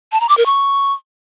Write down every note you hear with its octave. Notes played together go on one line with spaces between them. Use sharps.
A5
A#5
D6
A#4
C#6